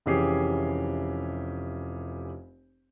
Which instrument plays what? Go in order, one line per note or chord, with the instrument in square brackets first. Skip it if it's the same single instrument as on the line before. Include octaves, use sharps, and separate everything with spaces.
[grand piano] F1 E3 C#4 G4 G#4 C7